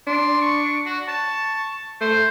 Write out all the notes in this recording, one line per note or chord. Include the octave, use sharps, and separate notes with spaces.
D4 C6
C#6
F#4
A5 C#6
A3 C5